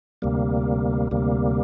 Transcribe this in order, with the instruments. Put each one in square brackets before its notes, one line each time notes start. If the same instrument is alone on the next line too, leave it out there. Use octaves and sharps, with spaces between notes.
[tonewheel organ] D2 C3 G3 A#3
D2 C3 G3 A#3